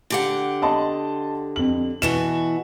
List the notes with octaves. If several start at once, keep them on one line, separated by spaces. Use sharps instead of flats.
D3 G4 F#5
D#5 A5 C6
F2 F#7
B2 E3 F#4 E7